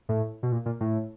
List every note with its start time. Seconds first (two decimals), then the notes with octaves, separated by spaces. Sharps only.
0.09 A2
0.43 B2
0.52 A#2
0.66 A#2
0.81 A2